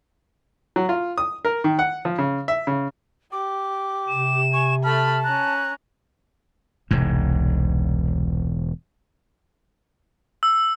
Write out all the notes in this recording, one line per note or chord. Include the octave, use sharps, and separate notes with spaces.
F#3
F4
D#6
A#4
D#3
F#5
F3
C#3
E5
C#3
G4 D6
C3 E7
G#5 C#6
A3 A5 B5 F6
C#4 A#5 F#6
E1 C2 G#2
E6